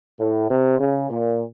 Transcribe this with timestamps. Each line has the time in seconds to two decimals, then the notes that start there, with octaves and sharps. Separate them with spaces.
0.18 A2
0.49 C3
0.79 C#3
1.10 A#2